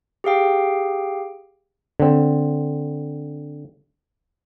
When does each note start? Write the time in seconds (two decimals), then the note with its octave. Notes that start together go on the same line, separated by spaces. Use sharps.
0.24 G4 G#4 F5 G5
2.00 D3 C4